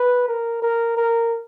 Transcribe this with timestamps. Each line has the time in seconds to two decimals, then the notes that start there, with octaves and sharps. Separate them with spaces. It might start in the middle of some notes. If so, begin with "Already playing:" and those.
Already playing: B4
0.28 A#4
0.62 A#4
0.97 A#4